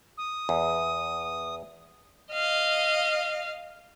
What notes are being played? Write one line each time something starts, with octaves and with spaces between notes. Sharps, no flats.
D#6
E2
D#5 F5